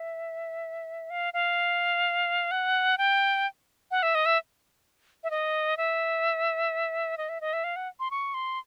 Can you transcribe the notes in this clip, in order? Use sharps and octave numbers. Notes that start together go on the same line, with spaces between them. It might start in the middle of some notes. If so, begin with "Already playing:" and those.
Already playing: E5
F5
F5
F#5
G5
F#5
E5
D#5
E5
E5
D#5
E5
D#5
E5
D#5
E5
F5
F#5
C6
C#6
C6